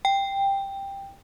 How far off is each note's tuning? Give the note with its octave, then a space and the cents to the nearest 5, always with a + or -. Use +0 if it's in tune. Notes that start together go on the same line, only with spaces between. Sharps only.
G5 +10